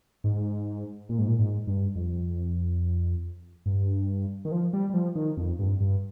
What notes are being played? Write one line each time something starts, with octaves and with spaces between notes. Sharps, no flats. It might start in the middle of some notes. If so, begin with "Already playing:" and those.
G#2
A#2
G#2
A#2
G#2
G2
F2
G2
D#3
F3
G3
G3
F3
D#3
F2
G2
G2